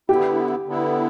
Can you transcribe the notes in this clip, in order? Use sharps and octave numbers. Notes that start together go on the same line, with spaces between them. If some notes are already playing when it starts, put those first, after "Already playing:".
D3 B3 E4 G4
D3 B3 E4